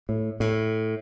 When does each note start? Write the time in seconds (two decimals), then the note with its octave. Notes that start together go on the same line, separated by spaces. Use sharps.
0.09 A2
0.40 A2